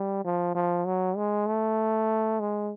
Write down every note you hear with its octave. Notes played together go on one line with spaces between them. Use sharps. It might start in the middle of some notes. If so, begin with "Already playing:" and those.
Already playing: G3
F3
F3
F#3
G#3
A3
G#3